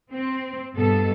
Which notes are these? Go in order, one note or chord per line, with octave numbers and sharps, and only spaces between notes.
C4
G2 B2 B3 A4